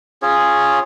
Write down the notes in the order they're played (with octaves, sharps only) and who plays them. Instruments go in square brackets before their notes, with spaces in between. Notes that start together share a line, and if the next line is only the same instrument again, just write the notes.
[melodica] C#4 F4 G#4 C#5